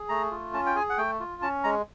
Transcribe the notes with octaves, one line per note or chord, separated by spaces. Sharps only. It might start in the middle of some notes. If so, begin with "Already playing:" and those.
Already playing: G#4
A3 A#5
F4
C#4 A5
G5
G#4 G#5
F#5
A3 G5
F4
C#4 A5
G#3 A#5